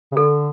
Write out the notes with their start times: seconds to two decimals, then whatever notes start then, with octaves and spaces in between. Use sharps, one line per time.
0.12 C#3
0.16 D3 A4